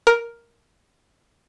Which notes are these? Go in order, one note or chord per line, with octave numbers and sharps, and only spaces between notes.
A#4